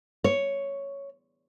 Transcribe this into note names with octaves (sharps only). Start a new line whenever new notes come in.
C#5